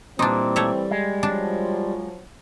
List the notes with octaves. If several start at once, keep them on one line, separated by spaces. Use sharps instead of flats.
A#2 E3 G3 C4 D4 D#4
A3 C#5 E5
G#3
F3 F#3 D4 A5